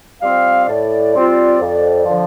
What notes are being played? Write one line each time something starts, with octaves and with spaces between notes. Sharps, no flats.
G3 C4 F4 F5
A2 D5
G3 C4 F4
F2
D3 F3